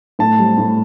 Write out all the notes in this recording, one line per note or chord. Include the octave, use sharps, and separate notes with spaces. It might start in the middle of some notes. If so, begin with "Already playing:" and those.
A2 A5
G3 C4
A2